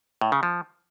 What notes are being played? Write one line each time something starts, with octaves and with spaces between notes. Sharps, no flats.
A2
C#3
F3